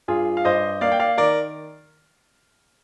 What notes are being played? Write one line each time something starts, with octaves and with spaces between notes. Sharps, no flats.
G2 F4 G#4
F5
G2 C5 D#5
A#3 D5 F5
G5
D5 F5
D#3 A#4 D5